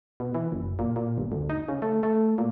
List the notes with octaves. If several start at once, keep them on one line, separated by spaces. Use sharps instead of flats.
B2
E3
F#1
A#2
A#2
G1
D2
D#4
C#3
A3
A3
A#2